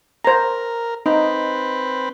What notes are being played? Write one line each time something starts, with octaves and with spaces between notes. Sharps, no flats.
A#4 C5 A#5
C4 D#4 B4